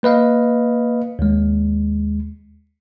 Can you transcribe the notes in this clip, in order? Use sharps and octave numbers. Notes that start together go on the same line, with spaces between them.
A#3 B4 D#5 F5
D#2 G#3